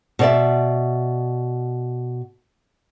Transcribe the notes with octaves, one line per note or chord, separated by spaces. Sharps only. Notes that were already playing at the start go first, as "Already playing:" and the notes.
B2 D5 E5